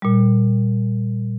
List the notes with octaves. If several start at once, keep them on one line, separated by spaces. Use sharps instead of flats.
A#2 G3